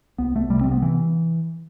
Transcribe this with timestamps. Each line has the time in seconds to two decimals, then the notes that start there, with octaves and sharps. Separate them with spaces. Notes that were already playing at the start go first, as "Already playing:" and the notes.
0.19 C2 B3
0.35 C2 A3
0.50 C3 G3
0.61 C4
0.66 C3
0.71 B3
0.82 E3